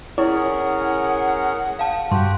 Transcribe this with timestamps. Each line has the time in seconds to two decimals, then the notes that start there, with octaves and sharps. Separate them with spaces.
0.18 C#4 E4 G#4 A#4 C#5 F#5
1.79 F5 A5
2.12 G2 F#4 G4 C6